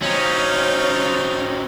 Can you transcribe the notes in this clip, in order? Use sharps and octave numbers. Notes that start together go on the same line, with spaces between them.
F#3 C4 C#4 D#4 F4